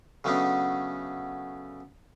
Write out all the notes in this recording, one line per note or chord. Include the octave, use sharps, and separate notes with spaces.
C#3 F#3 A3 B3 C#4 D4